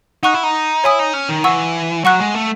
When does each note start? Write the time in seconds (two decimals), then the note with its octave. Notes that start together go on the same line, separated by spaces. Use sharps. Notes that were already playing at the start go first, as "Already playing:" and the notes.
0.23 D#4 F#5 C#6 F#6
0.34 E4
0.43 D#4
0.84 E4 C#5 G#5 D#6
0.99 D#4
1.13 C#4
1.29 D#3
1.44 E3 F#5 C#6 E6
2.04 F#3 F#5 C#6 F#6
2.20 G#3
2.34 A3